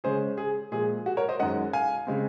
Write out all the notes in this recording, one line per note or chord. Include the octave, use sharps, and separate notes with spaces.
C#3 G#3 C#4 G#4 C5
G#4
A#2 F3 G#3 G#4
F#4
A#4 C#5
C5 D#5
F#2 D#3 G#3 C#4 D#5 F#5
F5 G#5
C#3 G#3 C4